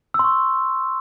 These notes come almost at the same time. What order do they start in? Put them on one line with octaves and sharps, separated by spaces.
E6 C6 C#6